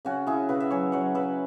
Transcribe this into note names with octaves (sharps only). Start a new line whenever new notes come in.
C#3 C#4 F#4
C#3 E4 G#4
C#3 F#4 B4
E5
F#3 G#4 C#5
F#3 C#5 F#5
C#3 B4 E5